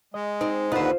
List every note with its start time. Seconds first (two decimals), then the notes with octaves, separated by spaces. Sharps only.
0.14 G#3 D#5
0.41 C4 D#4
0.72 D#2 D3 D#4 F4 B4 C5 F#5